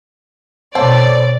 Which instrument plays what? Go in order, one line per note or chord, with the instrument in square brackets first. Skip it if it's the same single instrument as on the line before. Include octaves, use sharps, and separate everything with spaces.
[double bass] B2 [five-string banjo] C4 A4 [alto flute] C#5 [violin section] D5